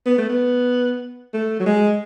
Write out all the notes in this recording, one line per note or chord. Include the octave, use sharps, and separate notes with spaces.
B3
A3
B3
A3
F#3
G#3